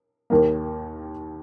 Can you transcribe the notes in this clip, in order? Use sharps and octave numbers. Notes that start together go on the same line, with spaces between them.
D#2 D#3 A#3